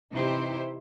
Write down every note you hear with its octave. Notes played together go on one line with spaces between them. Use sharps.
C3 E3 D#4 E4 G4 C5